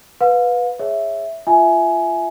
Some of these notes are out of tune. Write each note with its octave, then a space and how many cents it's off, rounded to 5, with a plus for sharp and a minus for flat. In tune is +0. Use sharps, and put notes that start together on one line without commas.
B4 +0 F5 +35
G#4 +0 C#5 +0 E5 +0
F4 -25 E5 +0 G#5 +15